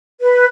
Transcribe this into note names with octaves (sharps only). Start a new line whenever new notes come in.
B4